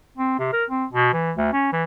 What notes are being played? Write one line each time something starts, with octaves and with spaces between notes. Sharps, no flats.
C4
C3
A#4
C4
B2
E3
D2
C#4
E3